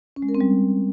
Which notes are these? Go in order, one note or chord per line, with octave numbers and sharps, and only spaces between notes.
C#4
G#3
A#4
C4
G3